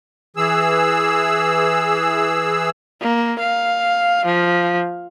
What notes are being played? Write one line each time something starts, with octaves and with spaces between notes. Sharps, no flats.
E3 G#4 E6
A#3
F5
F3